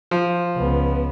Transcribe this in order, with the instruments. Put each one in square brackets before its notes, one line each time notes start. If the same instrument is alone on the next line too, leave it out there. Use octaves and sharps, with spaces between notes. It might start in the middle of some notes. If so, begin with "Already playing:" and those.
[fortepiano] F3
[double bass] C#2 B3